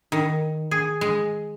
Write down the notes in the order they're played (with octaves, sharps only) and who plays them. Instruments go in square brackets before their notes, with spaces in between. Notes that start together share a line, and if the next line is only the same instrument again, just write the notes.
[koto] D#3
G#4
G#3